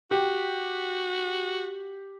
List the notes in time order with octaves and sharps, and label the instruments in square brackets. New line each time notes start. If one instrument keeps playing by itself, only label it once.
[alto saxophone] F#4 [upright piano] G4